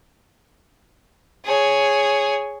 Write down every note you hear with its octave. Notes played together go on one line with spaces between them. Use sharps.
G#4 C#5